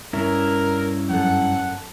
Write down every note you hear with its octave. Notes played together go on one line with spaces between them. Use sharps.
G2 C#4 E4 A#4
F#2 A4 F#5